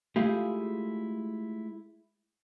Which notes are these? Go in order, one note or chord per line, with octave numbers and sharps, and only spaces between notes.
G#3 A3 E4 F4 G4 G#4